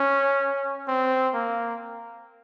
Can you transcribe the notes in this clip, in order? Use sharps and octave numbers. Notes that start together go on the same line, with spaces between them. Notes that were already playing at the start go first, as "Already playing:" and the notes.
Already playing: C#4
C4
A#3